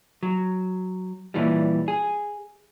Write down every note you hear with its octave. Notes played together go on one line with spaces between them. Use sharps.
F#3
A#2 E3 G3
G#4